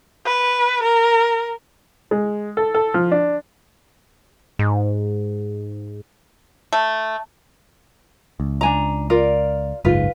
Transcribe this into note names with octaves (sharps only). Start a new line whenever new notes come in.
B4
A#4
G#3
A4
A4
F3
D4
G#2
A3
C#2
D4 G#5 A#5
F4 A#4 D5
F#1 C#2 G#2 F4 B4